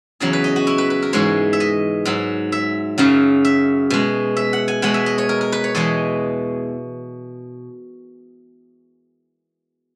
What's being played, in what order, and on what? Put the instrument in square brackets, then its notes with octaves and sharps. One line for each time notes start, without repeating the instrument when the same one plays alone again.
[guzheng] E2 C#3 F#3 G#4
B4
D#5
F#4
E4
B4
B4
A#4
G#2 E3 G#3 C#5
E5
D#5
G#2 F#3
E5
F#2 C#3 F#3
E5
B2 G#3
E5
F#5
G#5
B2 G#3 F#5
E5
D#5
C#5
A#4
A#4
B4
C#5
E2 B2 G#3 D#5